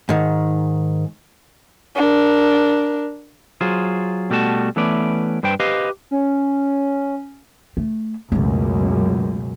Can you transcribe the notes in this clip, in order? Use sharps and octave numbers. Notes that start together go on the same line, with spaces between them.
G#2 D#3
D4 A#4
F#3 F4 G#4 C5
B2 G3 A3 F#4 A5
E3 A3 B3 C#4 B4 D5
G2 B4 C5 G5
G4 B4 C5 D#5 F5
C#4
A3
C#2 F#2 B2 F#3 A3